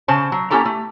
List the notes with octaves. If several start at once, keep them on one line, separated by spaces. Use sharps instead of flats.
C#3 C5 A5
F#3
A#3 C#4 E4 G4 A4 A#5
A3